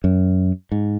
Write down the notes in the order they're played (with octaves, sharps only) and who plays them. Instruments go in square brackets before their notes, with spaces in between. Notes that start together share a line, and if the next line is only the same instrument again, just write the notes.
[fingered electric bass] F#2
G#2